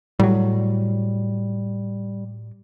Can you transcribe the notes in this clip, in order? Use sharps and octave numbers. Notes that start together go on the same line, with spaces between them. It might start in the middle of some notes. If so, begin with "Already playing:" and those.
A2 F#3 G3